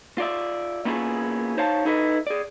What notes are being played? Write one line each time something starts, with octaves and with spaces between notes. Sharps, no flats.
F4 D5 E5
A#3 B3 C#4 E4 F4 G#4
D#4 C5 C#5 F5 A5
D#4 E4 A4 B4 D#5
G#4 D5